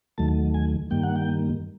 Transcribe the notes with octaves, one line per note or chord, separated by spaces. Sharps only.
D#2 D#3 F#3 A3 A5
G#5
G2 D#3 G3 A#3 G5
F#5
G5